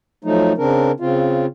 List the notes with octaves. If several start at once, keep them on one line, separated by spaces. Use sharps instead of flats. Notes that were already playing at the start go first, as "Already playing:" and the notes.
F3 F#3 A3 D#4
C#3 C4 D4 A#4
C#3 C4 F4